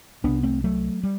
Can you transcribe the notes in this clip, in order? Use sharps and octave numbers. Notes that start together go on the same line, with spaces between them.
C2 C3 B3 D4
A3 C4
F#3 A3
G3